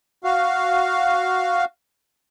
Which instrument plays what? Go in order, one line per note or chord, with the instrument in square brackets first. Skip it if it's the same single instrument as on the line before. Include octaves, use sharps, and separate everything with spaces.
[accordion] F#4 F5